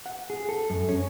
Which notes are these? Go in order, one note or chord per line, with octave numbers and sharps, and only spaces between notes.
F#5
G#4
A4
F#2
C#4